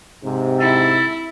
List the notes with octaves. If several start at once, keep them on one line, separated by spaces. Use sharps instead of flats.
G#2 C3
E4 A4